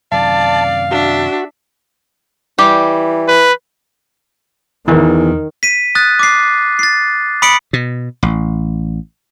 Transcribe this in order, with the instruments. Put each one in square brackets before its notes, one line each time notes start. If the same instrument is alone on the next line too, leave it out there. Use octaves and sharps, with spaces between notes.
[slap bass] F#2 C3 D#3 [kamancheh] D5 [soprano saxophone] F5 [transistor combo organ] A5
[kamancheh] D4 E5 [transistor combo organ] F#4
[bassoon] E3 [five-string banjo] G3 G4
[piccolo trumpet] B4
[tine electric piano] E2 E3 [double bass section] D#3
[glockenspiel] B6 D#7
D#6 F#6 A6
D6 C7
A6 C7
B5 D#6 B6 C#7 D7 F#7
[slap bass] B2
A1